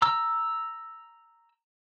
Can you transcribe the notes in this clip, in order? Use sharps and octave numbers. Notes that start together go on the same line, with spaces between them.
A#5 E6